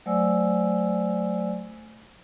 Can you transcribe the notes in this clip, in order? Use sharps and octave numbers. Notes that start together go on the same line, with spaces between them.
F#3 A3 C5 D5 G#5 E6